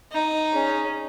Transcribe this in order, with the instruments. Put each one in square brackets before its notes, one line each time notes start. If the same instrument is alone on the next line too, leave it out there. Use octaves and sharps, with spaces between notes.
[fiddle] D#4
[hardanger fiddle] C#4 G#4